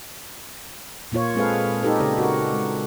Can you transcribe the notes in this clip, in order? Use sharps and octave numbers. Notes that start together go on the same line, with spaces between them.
A#2 A#3 F4 C#5
G#3 C4 G#4 A4 B4 F5
D#4 F4 G4 A4 B4
C#3 G4 D5
F#4 A#4
G#3